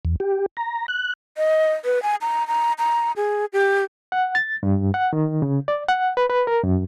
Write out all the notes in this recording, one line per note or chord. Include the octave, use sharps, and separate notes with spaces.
E2
G4
A#5
F#6
D#5
B4
G#5
A#5
A#5
A#5
G#4
G4
F#5
A6
G2
F#5
D#3
C#3
D5
F#5
B4
B4
A#4
F#2